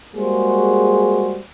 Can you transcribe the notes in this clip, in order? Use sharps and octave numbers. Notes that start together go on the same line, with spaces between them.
G3 G#3 A#3 F#4 G#4 C5